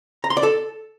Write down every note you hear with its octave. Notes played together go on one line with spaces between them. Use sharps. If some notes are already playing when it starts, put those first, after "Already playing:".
A#5
C6
D5
A4